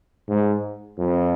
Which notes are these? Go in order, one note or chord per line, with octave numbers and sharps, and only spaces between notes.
G#2
F2